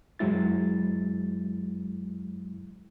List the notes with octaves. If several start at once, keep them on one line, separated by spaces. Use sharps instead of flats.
F#2 F#3 G#3 E4 A6